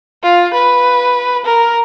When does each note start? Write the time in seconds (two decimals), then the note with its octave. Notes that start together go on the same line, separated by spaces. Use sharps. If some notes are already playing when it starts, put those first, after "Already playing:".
0.23 F4
0.55 B4
1.46 A#4